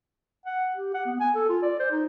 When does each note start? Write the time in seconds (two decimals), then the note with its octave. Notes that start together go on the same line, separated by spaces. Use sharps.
0.46 F#5
0.76 G4
0.94 F#5
1.06 B3
1.20 G#5
1.35 A4
1.49 F4
1.63 D5
1.80 C5
1.91 D#4